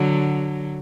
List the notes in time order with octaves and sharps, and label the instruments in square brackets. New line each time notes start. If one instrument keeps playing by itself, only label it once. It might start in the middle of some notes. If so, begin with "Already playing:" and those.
Already playing: [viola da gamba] D3 F#3